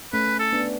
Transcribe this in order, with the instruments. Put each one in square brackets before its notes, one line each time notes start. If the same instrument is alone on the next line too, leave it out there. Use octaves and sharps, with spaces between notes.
[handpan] A3 C#4 [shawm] B4
[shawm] A4
[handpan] B3 D4